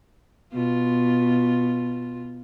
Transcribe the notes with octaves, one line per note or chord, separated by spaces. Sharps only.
B2 F4